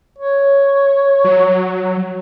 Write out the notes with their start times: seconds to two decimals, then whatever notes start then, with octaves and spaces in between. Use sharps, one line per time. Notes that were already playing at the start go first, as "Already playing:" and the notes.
0.18 C#5
1.24 F#3